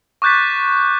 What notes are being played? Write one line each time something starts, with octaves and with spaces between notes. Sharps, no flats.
C#6 D6 F#6 G6 A6 B6